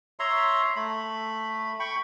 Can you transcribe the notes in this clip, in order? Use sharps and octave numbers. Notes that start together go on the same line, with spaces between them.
C#5 E5 A#5 C6
A3 B5
G5 B5 C#6